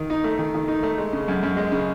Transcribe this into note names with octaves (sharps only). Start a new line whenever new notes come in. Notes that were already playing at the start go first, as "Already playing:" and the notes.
Already playing: D#3
D#4
A3
D#3
D#3
D#4
A3
G#3
C#3
F#2
F#2
G#3
C#3